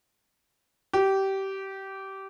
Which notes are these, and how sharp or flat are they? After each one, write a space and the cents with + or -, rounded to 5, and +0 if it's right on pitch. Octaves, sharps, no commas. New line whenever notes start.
G4 -20